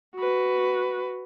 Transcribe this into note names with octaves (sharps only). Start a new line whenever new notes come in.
F#4 B4